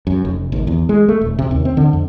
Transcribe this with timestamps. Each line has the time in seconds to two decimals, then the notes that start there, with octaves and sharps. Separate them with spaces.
0.07 F#2
0.25 F1
0.52 G#1
0.67 E2
0.89 G#3
1.09 A3
1.21 D#1
1.39 C3
1.51 D#2
1.65 C4
1.77 D3
1.93 F2